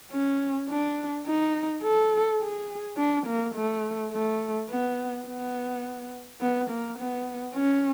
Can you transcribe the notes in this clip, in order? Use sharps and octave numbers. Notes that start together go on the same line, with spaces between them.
C#4
D4
D#4
A4
G#4
D4
A#3
A3
A3
B3
B3
B3
A#3
B3
C#4